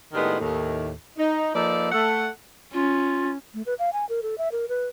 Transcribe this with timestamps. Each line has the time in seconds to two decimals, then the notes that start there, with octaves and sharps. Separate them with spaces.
0.14 A2 D#3 G#3 B3 D4 G4
0.40 D#2 A2 D#3
1.18 D#4
1.54 F3 A#3 D#4 A4 B4 D5
1.91 A3 A4 F#5
2.73 C#4 F4
3.54 A3
3.66 B4
3.79 F5
3.93 G#5
4.09 A#4
4.23 A4
4.38 E5
4.52 A#4
4.69 B4